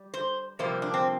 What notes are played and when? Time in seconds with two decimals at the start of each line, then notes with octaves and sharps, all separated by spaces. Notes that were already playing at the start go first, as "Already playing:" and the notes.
Already playing: G3
0.14 C5
0.59 F2 C3 G3 A#3 C5
0.82 D4
0.94 C4